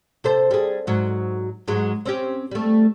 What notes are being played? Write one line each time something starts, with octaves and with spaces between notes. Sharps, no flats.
C3 A4 C5
G3 G#4
G#2 F#3
G#2 F#3 G#3
C4 C#4 G4
G3 A3